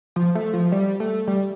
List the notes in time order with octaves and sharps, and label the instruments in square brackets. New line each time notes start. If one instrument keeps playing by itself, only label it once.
[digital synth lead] F3
A3
F3
G3
A3
G3